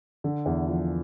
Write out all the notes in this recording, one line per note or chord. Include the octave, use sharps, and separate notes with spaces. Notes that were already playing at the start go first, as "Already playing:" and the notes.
D3
E2
F3